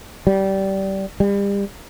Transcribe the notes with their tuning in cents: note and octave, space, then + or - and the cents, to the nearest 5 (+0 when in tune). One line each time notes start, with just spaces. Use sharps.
G3 -20
G3 +35